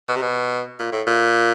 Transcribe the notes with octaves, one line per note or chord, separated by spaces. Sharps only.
B2
C3
B2
A#2
A2
A#2